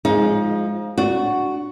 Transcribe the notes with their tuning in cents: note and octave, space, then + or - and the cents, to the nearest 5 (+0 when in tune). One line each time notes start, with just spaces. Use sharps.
F3 +10 G#3 +0 D#4 +25
D4 +0 F#4 +0